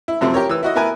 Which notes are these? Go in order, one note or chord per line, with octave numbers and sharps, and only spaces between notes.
E4
F#2 C3 F3 A3 C4
G4 A#4 C#5
E3 E6
E4 F#4 D#5
B3 E4 A#4 B4 G#5